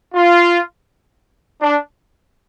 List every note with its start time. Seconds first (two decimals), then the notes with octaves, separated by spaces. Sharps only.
0.14 F4
1.60 D4